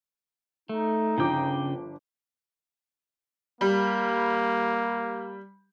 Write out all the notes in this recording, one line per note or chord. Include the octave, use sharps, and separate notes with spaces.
A3 D#4
G1 C#3 F3 G5 D6
G3 A#3